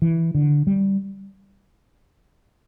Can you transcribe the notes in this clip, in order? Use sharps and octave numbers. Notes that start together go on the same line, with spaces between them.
E3
D3
G3